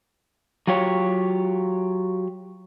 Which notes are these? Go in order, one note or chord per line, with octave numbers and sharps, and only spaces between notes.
F#3 F4 G4 C#5